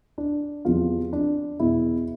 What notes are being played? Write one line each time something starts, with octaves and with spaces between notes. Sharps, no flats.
D4
E2 C3 F3 F4
D4
E2 B2 E4